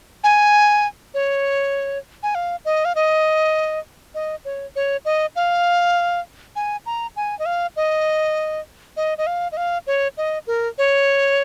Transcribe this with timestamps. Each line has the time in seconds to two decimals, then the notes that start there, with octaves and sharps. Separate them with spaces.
0.24 G#5
1.14 C#5
2.23 G#5
2.35 F5
2.65 D#5
2.85 F5
2.95 D#5
4.15 D#5
4.45 C#5
4.76 C#5
5.05 D#5
5.36 F5
6.56 G#5
6.86 A#5
7.16 G#5
7.39 D#5
7.46 F5
7.76 D#5
8.97 D#5
9.18 D#5
9.27 F5
9.52 D#5
9.57 F5
9.87 C#5
10.17 D#5
10.47 A#4
10.78 C#5